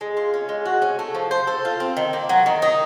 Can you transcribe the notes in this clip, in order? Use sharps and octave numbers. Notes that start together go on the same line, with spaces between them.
G#3
F4
C#4
G#3
F#4
C#4
A3
F3
C5
A4
F4
C4
D#3
A#3
F#3
D#3
D#4